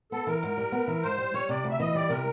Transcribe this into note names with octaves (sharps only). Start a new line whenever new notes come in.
B3 A4
E3 A#4
G#2
G3
B3
E3
G#2 C5
G3
G3 C#5
C3 D5
D2
E5
E3 D#5
G3 D5
C3 A#4